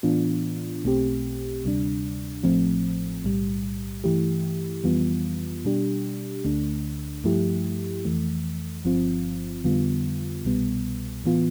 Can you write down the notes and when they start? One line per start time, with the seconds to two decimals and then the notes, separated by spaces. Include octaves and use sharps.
0.03 A2 E3 B3 D4 F4
0.84 B1 B2 A3 C4 G4
1.64 D2 C3 G3 D4
2.43 A1 A2 F3 A3 C4
3.24 B1 A2 G3
4.04 G2 E3 A3 E4 G4
4.84 F2 E3 G3 B3 F4
5.65 B2 G3 D4 G4
6.44 D2 D3 A3 D4
7.24 G2 F3 A3 E4 G4
8.05 F2 E3 A3
8.84 G1 G2 F3 C4 F4
9.64 F2 D3 G3 B3 F4
10.44 C2 B2 G3 B3
11.24 A2 E3 B3 F4